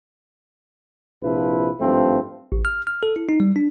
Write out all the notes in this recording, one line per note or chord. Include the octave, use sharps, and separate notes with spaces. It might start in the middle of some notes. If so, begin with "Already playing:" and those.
A#1 C3 F3 E4 B4
G#1 G2 F3 A3 C4
A1
F6
F6
A4
E4
D#4
G3
D4